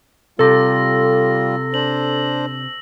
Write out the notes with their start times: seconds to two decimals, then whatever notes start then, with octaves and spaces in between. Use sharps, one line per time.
0.39 C3 G3 F4 A4 E6 A#6
1.74 D4 C5 F#7